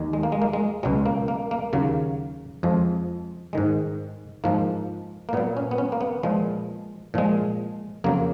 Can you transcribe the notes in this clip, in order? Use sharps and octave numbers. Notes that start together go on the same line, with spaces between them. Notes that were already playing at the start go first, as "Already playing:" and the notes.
Already playing: D#2 D#3
G#3
A#3
G#3
A#3
G#3
C#2 B2 F#3 G#3
A#3
A#3
A#3
D#2 C#3 F#3 A#3
F2 F3 G#3
G#2 D#3 G#3
G#2 F3 G#3 A#3
A#3
A#2 F#3 B3
C#4
B3
C#4
A#3
B3
A#2 F3 G#3
A#2 F3 G#3
F2 C#3 F#3 A#3